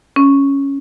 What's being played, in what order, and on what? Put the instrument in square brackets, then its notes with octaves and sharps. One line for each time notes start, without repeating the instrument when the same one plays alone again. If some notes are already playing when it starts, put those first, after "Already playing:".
[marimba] C#4